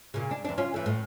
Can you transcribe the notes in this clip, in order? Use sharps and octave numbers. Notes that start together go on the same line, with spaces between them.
A#2 C#3
D4
E2 D4
C#4 F4
E3 A3
A2